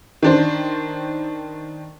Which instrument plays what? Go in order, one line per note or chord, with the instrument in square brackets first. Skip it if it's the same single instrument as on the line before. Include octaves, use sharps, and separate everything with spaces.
[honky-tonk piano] D#3 D4 C5